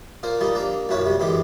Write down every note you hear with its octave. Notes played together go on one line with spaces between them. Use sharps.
A#2 A#3 A#4 C5
A#2 F3 G3 D#4
A#3 D4 A#5
B1 F#2 A#2 E4 B4 C#5
C3 G3
F#2 E3 G#3 G4